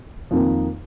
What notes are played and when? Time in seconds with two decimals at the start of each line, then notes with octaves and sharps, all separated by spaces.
0.31 F2 D#3 A#3